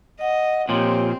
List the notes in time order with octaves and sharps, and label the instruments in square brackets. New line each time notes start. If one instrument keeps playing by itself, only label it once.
[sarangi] D#5 [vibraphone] F#5
[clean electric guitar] A#2 F3 [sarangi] C4 [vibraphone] G4 C#5